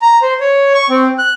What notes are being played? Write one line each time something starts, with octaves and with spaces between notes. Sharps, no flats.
A#5
C5
C#5
C#6
C4
F#6